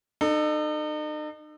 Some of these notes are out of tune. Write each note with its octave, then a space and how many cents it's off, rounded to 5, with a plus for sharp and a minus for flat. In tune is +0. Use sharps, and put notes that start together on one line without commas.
D#4 -40 A4 +0